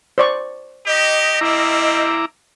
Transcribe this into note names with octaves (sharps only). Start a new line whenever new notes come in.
C5 D5 C#6
D#4 G4 D#5
G3 A#3 C4 E4 A#5 D6